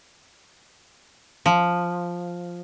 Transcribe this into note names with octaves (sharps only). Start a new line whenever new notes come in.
F3